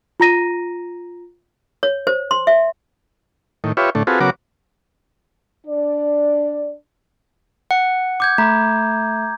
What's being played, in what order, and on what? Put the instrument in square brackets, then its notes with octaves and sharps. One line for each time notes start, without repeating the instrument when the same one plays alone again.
[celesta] F4 A#5 A#6 D#7
[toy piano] C#5
C5
C6
E5
[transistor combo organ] A2 D#3
F4 G4 B4 C#5 E5
A2 D3 A3
C4 F4 F#4 G#4 A4 B4
C#3 F#3 B3 F#4 A#4 D6
[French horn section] D4 D5
[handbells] F#5
[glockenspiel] D6 G6 G#6
[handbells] A3 [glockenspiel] A#5